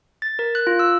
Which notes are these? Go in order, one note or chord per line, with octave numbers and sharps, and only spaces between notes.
A6
A#4
F#6
F4
E6